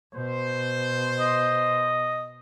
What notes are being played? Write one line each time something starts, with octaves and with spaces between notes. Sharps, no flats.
B2 C5
D#5